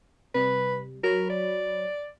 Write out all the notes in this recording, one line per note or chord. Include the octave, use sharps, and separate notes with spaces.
C3 G3 B4
F#3 A#4 C#5 B5
D5